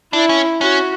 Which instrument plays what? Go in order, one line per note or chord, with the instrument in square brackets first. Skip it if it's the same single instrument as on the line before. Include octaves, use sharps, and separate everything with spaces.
[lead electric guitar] D4 [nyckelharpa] E4
[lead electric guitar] C#4
[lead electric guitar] C#4 [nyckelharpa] F#4